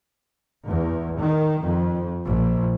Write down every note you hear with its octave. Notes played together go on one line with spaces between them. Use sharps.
E2
D#3
F2
A#1